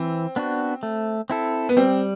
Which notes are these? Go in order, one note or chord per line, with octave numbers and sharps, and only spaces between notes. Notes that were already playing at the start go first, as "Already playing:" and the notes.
Already playing: E3 C4
B3 D4 F#4
A3
C4 E4 A4
B3
G3 C4